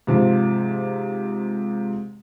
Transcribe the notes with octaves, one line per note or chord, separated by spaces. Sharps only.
G#2 C3 F3